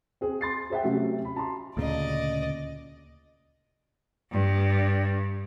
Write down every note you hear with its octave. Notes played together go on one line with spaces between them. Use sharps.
C4 G#4
C6 A6 C7
G#4 C5 E5 F#5 G5
C3 F#3 A3 C#4
B5
A5 A#5 C6
D2 A#2 C#3 D5 D#5
G2